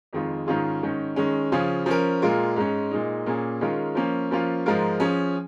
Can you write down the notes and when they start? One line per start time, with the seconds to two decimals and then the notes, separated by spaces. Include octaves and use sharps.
0.13 F2 D#3 G#3 F4
0.47 G#2 D#3 C#4 F4 G#4
0.83 G#2 D#3 C#4
1.16 D#3 G#3 C#4
1.52 C#3 F3 C#4 F4 G#4
1.86 F3 C#4 A#4
2.22 A#2 G#3 F4 A#4
2.56 G#2 G#3 C#4
2.91 A#2 G#3 D#4
3.26 A#2 A#3 C#4 G#4
3.61 D#3 G#3 C#4 F4 A#4
3.95 F3 A#3 C#4
4.31 F3 A#3 C#4 F4
4.66 G#2 F3 G#3 F4 A#4
5.00 F3 C#4 G#4